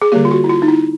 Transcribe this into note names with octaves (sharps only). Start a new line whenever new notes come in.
G#4
D3 G3 A#3 G4
F4
F#4
E4
F4
D#4
E4